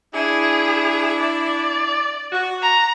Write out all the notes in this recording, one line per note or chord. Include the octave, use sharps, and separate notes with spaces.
D4 E4 G#4
D5
F#4
A#5